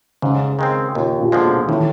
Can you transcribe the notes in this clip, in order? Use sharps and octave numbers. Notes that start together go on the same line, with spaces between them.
G#2 C#3
D#3 G#3 C4
D#2 A#2
A#2
D3 F3 G#3
B2
A2 E3
D#3